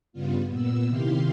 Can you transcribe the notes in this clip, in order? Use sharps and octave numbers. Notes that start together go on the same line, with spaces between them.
G2 C#3 G3 B3 F4
A#2 B3 E6
C3 D#3 E4 G4 F5 C6